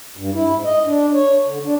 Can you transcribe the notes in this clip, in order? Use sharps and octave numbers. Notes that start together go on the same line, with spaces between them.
G2
E4
G#2
D#5
D4
C#5
D3
D4